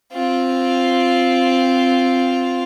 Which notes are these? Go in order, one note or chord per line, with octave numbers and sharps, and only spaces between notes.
C4 F4